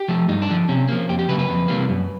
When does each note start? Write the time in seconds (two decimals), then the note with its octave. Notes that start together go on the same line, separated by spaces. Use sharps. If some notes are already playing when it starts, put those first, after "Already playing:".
Already playing: G4
0.08 F3 A3
0.28 G2 D#4
0.42 D4
0.49 D3 F3
0.69 C3 C#4
0.89 F3 A#3
1.09 F2 G4
1.19 G4
1.29 C#3 F#3 A#3 B4
1.39 B4
1.49 F2
1.68 C3 E3 G3 A#3
1.89 F#2